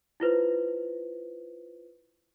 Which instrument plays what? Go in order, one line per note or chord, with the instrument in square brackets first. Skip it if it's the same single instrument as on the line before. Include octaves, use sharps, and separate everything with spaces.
[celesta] E4 F4 B4 C5